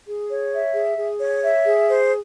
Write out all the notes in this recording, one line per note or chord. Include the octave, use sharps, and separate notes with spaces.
G#4
C#5
E5
G#4
G#4
C#5
E5
G#4
C5